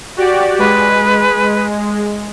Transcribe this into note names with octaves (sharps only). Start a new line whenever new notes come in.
F#4 G4 D5
G#3 B4